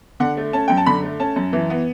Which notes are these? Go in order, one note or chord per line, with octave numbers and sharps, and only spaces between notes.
D3 F#5
A3
C#4 A5
F#2 G5
A5
D3 B5
A3
C#4 A5
F#2
E3
B3